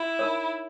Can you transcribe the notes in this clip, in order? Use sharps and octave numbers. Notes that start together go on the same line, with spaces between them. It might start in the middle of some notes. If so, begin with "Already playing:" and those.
Already playing: E4
D#4 A#4 C#5